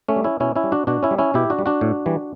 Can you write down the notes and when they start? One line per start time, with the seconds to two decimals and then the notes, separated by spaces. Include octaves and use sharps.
0.08 A3 C#4
0.16 G3
0.24 C#4 E4
0.40 B2 C#4 E4
0.55 C#4 E4
0.64 G3
0.72 D4 F#4
0.87 B2 D4 F#4
1.03 C#4 E4
1.11 G3
1.18 C#4 E4
1.34 B2 E4 G4
1.50 D4 F#4
1.59 G3
1.66 D4 F#4
1.81 A2
2.06 E3 G3